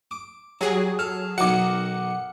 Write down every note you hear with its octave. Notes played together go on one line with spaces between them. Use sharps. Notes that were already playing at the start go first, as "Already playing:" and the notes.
D6
F#3 G3 G#4
A4 F6
B1 D#3 F#3 F#5 D6 C#7